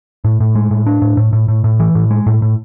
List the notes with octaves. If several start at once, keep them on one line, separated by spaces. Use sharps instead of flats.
A2
A2
G#3
A2
D4
A2
A2
A2
A2
A2
E3
A2
G#3
A2
A2